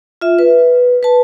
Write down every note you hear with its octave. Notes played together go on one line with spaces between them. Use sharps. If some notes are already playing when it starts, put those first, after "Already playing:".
F4 E5
B4
B4 A5